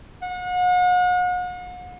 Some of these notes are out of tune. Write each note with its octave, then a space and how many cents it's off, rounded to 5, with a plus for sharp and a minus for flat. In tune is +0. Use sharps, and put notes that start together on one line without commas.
F#5 -40